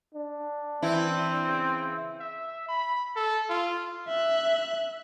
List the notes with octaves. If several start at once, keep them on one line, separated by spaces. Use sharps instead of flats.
D4
E3 C4 E4
C#3
E5
B5
A4
F4
E5 F#6